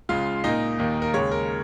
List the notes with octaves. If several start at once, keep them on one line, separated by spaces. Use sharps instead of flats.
C#2 C#3 G#3 F4 F5
A#2 A#3 D#4 D#5
D#2 D#3 A#3
A#4
D#2 C#3 G#3 C#5
A#4